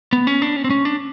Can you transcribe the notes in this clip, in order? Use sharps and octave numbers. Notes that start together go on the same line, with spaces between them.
B3
C#4
D4
C#4
C4
C#4
D4